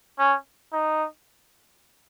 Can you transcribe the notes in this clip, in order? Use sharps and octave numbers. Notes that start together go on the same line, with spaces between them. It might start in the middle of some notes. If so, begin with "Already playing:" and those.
C#4
D#4